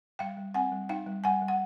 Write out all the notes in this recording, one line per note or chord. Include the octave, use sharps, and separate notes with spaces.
G3 F5 G5
G3
C4 F#5 G#5
G3
D#4 F5 G5
G3
G3 F#5 G#5
G3
F#5